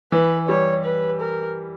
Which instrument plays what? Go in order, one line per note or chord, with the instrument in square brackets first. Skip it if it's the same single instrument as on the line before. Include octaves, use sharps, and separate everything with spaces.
[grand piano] E3 [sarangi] B4
[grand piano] G3 [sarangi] C#5
[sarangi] B4
A#4